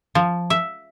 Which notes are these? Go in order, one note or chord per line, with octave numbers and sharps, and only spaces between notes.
F3
E5